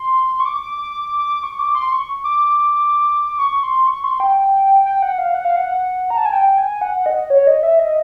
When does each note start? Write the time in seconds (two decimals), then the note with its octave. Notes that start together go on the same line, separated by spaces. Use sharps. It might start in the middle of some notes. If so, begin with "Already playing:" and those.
Already playing: C6
0.40 C#6
0.46 D6
0.62 D6
0.78 D6
0.94 D6
1.18 D6
1.43 C#6
1.59 D6
1.75 C6
1.92 C#6
2.24 D6
3.39 C#6
3.63 C6
3.87 C#6
4.04 C6
4.20 G5
4.86 G5
5.02 F#5
5.18 F5
5.34 F#5
5.45 F5
5.56 F#5
6.10 A#5
6.17 A5
6.25 G#5
6.33 G5
6.58 G#5
6.81 F#5
7.06 D#5
7.30 C#5
7.47 D#5
7.63 E5
7.79 D#5